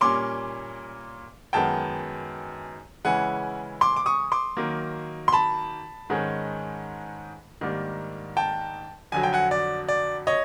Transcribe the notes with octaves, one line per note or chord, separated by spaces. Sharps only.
A#2 G3 A#3 C#4 C6 D6
F#2 D#3 G#3 B3 G5 A5
C#3 E3 G#3 C#4 E4 F#5 G#5
C6 D6
D6
C#6 D#6
C6 D6
D#3 F#3 A#3
C6
A5 B5
G#2 D#3 G#3 C#4
G#2 D#3 G3 A#3 D4
G5 A5
F2 D3 F#3 G#5
G5
F#5 G#5
D5
D5
C#5 D#5